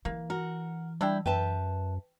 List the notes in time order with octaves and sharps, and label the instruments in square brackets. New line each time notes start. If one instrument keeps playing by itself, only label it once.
[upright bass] E3 [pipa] A#3
[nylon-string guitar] F#4 [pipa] A#4
[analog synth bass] G3 [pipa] D4 E4 G5
[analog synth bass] F#2 [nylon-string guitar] B4 E5 A5 [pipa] G5